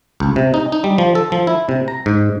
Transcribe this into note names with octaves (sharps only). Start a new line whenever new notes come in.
C#2
C3
D#4
D#4
G3
F3
A4
F3
E4
C3
A#5
G#2